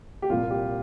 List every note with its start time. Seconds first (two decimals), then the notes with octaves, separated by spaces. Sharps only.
0.22 G4
0.29 C2 A#2 F3 F4
0.50 G4